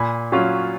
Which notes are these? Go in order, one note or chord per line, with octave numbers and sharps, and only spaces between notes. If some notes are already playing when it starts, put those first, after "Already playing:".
Already playing: A#2 G#5 B5
F#3 C#4 F4